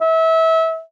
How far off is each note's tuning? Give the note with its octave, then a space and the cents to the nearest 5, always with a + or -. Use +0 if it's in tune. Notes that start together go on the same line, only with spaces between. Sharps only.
E5 -25